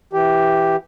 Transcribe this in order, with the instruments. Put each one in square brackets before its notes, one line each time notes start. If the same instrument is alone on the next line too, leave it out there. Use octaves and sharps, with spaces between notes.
[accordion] E3 G4